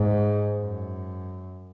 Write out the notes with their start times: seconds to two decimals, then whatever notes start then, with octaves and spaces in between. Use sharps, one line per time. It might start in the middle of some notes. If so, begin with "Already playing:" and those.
Already playing: G#2
0.56 F#2